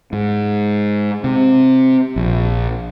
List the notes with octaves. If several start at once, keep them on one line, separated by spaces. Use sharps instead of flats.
G#2
C3
A#1